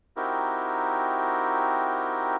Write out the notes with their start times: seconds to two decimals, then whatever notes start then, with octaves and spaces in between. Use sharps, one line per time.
0.17 C4 D#4 E4 F#4 G4 A#4